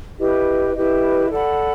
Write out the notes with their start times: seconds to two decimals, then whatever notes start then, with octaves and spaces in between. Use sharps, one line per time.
0.18 E4 G4 B4 D#5
0.74 E4 G4 B4 D#5
1.30 A4 D5 F#5 B5